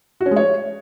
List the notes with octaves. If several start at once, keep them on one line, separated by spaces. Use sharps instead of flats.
F#4
C#4
G#3
C#5